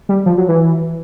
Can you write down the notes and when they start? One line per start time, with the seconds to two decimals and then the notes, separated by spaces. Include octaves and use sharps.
0.09 G3
0.26 F3
0.38 F#3
0.48 E3